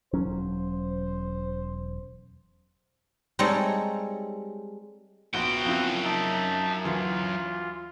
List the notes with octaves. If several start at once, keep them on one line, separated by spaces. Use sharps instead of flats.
E1 F#3 C#4 C5
G3 G#3 C4 D#4 A4 C#5
A#1 F#2 B3 F#4 G5
F3 C4 E4
D#4 E5 A5
D2 E3 F4